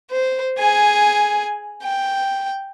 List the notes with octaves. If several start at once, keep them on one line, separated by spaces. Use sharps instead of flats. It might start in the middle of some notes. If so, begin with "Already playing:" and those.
C5
G#4 G#5
G5